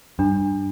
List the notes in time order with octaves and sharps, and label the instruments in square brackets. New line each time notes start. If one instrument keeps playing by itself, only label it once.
[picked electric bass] G2 [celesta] D4